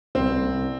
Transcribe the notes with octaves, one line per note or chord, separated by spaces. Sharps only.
C2 C4
C3